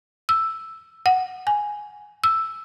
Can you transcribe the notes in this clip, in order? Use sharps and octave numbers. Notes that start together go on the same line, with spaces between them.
E6
F#5
G#5
E6